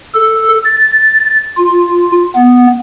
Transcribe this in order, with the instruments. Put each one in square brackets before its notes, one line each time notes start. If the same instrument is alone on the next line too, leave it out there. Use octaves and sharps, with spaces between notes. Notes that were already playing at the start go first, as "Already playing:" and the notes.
[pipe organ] A4
A6
F4
B3